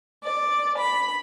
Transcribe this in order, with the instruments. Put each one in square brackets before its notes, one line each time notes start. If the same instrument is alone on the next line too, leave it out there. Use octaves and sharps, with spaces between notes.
[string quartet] D5
B5